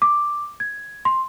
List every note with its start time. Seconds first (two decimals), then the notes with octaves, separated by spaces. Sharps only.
0.02 D6
0.60 G#6
1.05 C6